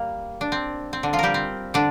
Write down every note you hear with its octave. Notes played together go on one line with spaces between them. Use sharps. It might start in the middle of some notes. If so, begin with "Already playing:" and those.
Already playing: G3 A#3
D4
C4
C4
D3 D4
F3 F4
G3 G4 A#4
C4
D3 D4